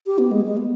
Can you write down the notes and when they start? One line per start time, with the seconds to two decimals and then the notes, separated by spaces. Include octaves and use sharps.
0.06 G4
0.18 B3
0.31 G#3
0.45 G#3
0.57 B3